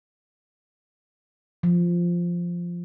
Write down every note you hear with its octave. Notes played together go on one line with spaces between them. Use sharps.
F3